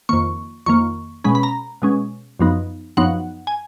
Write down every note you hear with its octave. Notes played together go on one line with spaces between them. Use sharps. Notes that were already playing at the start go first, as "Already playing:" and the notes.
F2 D#3 A#3 C#6
F2 D#3 A#3 C#6
B2 G#3 C#4 B5
B5
A#5
B2 G#3 C#4
F#2 F3 B3 D#4
F#2 F3 B3 D#4 F#5
G#5